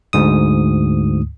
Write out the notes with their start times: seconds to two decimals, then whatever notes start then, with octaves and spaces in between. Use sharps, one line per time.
0.13 D2 G#2 D#6